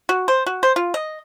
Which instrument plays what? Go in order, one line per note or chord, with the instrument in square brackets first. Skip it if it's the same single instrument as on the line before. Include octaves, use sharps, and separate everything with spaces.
[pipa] F#4
C5
F#4
C5
F4
D#5